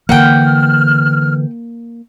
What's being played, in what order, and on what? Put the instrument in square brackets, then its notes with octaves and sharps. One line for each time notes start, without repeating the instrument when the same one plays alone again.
[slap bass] D3 E3 [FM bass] A#3 [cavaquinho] F#5 G5 [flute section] F6